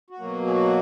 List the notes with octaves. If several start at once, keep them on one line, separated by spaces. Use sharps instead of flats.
F#4
B2 F#3 A#3
G#4
F#4